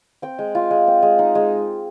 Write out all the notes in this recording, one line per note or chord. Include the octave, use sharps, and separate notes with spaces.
C4 G5
G#3
F4
G#3
C4
G#3
D#4
G#3